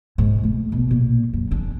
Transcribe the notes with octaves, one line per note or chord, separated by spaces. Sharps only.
G#2 B2
A3
A#1 B2
A#2
F#2
E2 D4